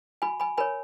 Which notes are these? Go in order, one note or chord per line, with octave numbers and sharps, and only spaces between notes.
F#4 G#5 B5
G#5 B5
A#4 C#5 G#5 B5